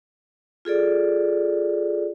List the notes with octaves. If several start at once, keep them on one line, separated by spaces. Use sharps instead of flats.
F4 G#4 A4 D5